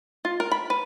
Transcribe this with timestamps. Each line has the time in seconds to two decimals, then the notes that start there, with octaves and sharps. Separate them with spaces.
0.25 F4
0.40 A#4
0.51 B5
0.70 B4